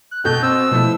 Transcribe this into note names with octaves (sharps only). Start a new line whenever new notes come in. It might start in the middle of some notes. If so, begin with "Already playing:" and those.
F#6
B2 A4 G6
C4 E6
B2 F3 A3 E4